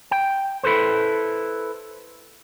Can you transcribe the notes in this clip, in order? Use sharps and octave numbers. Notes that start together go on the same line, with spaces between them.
G5
E4 A4 B4 C5